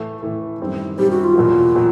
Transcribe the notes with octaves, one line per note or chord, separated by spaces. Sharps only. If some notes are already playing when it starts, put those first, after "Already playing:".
Already playing: A2 E3 A3
A2 E3 A3
F#2 D#3 G3 C4
F#2 D#3 G3 C4 G4
F#4
F4
E2 B2 F#3 A#3
B2 F#3